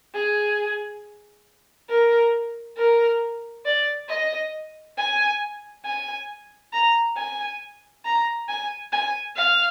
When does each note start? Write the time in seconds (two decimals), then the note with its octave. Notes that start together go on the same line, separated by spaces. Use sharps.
0.14 G#4
1.90 A#4
2.77 A#4
3.65 D5
4.09 D#5
4.98 G#5
5.85 G#5
6.73 A#5
7.17 G#5
8.05 A#5
8.49 G#5
8.92 G#5
9.36 F5